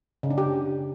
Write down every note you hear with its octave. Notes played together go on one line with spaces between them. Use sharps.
C#3
D4
G4